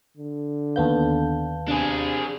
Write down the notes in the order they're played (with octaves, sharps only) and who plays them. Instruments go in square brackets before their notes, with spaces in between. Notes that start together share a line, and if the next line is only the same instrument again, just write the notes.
[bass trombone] D3
[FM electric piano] D#2 B3 G6 [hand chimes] F5 A5
[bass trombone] C3 [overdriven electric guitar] D4 G#4